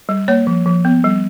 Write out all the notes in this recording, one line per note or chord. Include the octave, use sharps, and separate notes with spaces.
G3
A#3 C#5
F3
F3
B3
G3